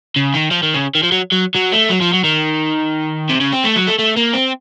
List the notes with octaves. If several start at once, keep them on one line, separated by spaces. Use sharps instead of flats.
C#3
D#3
F3
D#3
C#3
D#3
F3
F#3
F#3
F#3
A3
F#3
F3
F#3
D#3
C3
C#3
C4
A3
F#3
A3
A3
A#3
C4